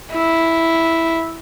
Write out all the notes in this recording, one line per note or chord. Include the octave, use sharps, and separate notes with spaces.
E4